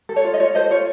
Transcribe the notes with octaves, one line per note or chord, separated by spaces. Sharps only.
A4
C#5
F4
D#5
F4 C#5
A4 C5 D#5
F4 C#5